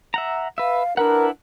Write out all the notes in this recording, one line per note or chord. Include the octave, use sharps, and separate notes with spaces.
E5 F#5 A#5
B4 E5 F5
D4 E4 A#4 B4 F#5